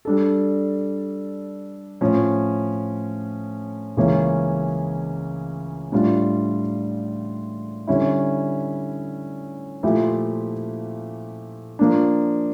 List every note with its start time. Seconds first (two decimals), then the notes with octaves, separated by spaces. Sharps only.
0.05 G3 D4 A4
2.01 A2 F3 C#4
3.97 C#2 C#3 E3 A#3 C#4
5.92 A2 G3 D4 F4
7.87 D3 G3 C#4 E4
9.83 A#2 F3 A3 E4 G4
11.79 F3 A#3 D4